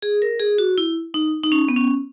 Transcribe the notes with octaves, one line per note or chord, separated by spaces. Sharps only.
G#4
A#4
G#4
F#4
E4
D#4
D#4
C#4
B3
C#4